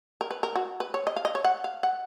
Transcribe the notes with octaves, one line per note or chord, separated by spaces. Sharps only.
A#4
B4
A#4
F#4
B4
C#5
D#5
F5
D#5
C#5
F#5
F5
F#5